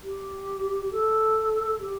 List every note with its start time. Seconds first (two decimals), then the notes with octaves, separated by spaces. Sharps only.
0.03 G4
0.92 A4
1.80 G4